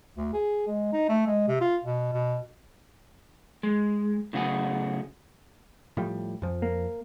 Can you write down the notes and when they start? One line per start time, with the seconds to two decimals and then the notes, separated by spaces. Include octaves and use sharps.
0.17 D2
0.33 G#4
0.67 G#3
0.93 D#4
1.09 A3
1.26 G#3
1.48 C3
1.61 F4
1.84 B2
2.13 B2
3.63 G#3
4.33 A2 C#3 F#3 F#4 G#4
5.97 A2 F3 G3
6.42 F2 F3
6.62 A#3